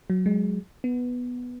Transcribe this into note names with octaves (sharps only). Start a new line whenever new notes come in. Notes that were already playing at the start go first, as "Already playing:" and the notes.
F#3
G#3
B3